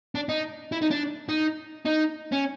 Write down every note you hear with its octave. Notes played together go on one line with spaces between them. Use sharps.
D4
D#4
E4
D#4
D4
D#4
D#4
C#4